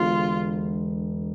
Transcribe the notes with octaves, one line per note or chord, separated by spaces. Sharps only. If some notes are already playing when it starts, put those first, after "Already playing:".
Already playing: E1 E2 D3 F4